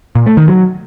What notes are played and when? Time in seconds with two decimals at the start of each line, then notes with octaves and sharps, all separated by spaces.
0.15 A#2
0.26 A3
0.37 D#3
0.48 F#3